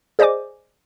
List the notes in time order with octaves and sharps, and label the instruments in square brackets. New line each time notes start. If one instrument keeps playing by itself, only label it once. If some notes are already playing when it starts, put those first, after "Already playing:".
[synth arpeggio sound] G#4 C5 D5 D#5 G#5 D6